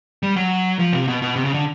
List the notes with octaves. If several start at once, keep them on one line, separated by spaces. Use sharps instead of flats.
G3
F#3
F3
C3
B2
B2
C3
C#3
D3